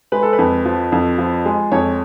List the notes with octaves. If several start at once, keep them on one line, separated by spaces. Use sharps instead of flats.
G#3 B4
A4
B4
F2
F3
F2
F3
G#3
F2 C#5